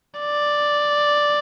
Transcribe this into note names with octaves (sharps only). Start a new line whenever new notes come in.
D5